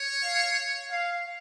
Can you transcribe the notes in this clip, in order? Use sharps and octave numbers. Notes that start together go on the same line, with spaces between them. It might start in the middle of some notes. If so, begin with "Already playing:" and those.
Already playing: C#5
F5
F5